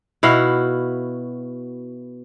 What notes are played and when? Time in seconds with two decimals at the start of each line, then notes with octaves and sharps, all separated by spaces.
0.23 B2 E4 F#4 F5